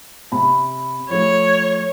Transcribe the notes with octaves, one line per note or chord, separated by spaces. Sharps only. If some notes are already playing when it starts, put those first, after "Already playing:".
C3 C4 B5
F3 A3 C#5